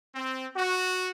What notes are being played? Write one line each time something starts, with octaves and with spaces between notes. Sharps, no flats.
C4
F#4